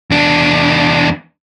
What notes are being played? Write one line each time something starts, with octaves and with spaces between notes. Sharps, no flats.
E2 D4